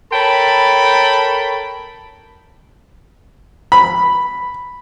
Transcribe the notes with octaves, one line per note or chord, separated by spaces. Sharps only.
A4 A#4 C#5 G5 A5 B5
B5